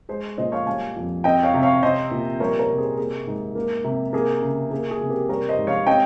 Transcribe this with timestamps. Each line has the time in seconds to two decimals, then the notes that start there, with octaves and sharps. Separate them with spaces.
0.09 G#3 G#4 C5
0.38 A#2 C5 D#5
0.52 C#5 F5
0.66 G3 F5 G#5
0.96 F2
1.24 C4 D#5 G5
1.43 C#5 F5
1.54 C3
1.62 C#5 F5
1.83 C4 C5 D#5
2.11 A#2
2.40 G3 A#4 C#5
2.59 A#4 C#5
2.70 C3
2.78 G#4 C5
2.97 A#3 G#4
3.27 G#2
3.55 A#3
3.84 C3
4.13 A#3 G#4
4.42 C#3
4.71 A#3 G#4
4.91 G#4
5.01 C3
5.09 G4 A#4
5.29 G3 A#4 C#5
5.49 C5 D#5
5.58 G#2
5.67 C#5 F5
5.87 C4 D#5 G5